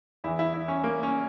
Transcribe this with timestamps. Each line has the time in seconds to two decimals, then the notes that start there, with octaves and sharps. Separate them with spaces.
0.24 E2 E3 E4
0.39 E4
0.54 E4
0.68 C#4
0.83 A#3
1.03 C#4